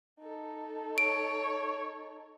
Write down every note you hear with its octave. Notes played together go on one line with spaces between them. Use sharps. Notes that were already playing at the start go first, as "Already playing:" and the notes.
D#4 A4
C#5 D7